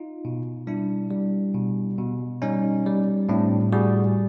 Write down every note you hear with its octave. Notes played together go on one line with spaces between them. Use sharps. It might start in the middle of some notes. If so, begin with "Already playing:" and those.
Already playing: D#4 F4
B2
G3 D4 E4
G3
B2
B2
G3 C#4 D#4
G3
A2 C4 D4
G3 F#4 G#4